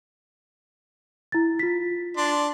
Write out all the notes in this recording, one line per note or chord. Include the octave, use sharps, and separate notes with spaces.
E4 A6
F4 B6
D4 C6